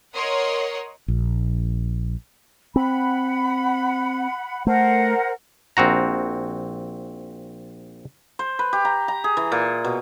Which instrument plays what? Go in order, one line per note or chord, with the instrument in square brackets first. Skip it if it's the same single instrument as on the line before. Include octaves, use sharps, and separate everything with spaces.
[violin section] A#4 C#5 D#5 F#5 C6
[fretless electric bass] A#1
[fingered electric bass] C4 [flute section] F#5 B5
[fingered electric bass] A3 [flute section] A#4 C5 F#5
[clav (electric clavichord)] A#1 C4 F#4 A#5
[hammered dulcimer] C5
B4
G4
A#5
A#5
G#4
E3
A#2
B2